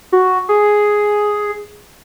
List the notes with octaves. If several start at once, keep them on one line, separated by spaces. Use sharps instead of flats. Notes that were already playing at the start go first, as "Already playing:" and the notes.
F#4
G#4